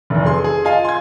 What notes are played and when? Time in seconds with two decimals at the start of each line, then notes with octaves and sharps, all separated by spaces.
0.10 F1 E2
0.26 G#4 C6
0.44 G#4
0.64 F4 D#5 F5 G#5
0.85 C6 G#6